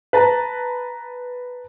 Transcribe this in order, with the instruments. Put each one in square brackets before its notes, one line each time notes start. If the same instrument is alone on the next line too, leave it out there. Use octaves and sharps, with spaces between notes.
[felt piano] B4 A5 A#5